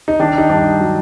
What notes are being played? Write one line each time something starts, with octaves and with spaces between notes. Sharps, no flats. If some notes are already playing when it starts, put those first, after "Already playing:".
D#4
D#3 D4
D#4
G2 D4
F#3